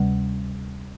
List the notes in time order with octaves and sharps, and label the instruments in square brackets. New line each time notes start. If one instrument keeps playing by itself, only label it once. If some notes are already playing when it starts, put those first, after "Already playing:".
Already playing: [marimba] D2 C3 G3